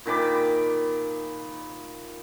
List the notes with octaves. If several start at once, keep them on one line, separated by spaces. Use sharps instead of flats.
A#2 D#3 B5 D6